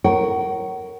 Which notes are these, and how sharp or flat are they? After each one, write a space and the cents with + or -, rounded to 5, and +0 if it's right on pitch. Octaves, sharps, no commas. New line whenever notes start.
A#4 +0 C#5 +0 F#5 +35